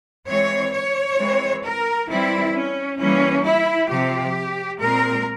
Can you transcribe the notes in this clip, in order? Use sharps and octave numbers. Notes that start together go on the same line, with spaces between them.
E3 G#3 C4 C#5
C#5
E3 G#3 C4
A#4
E3 G3 C4 E4
C#4
E3 G3 A#3 C#4
E4
C3 F3 C4 G4
A#2 G#3 C4 A#4